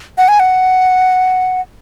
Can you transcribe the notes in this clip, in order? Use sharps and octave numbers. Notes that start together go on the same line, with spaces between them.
F#5
G#5
F#5